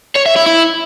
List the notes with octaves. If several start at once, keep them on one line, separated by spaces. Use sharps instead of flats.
C#5
E5
E4
E4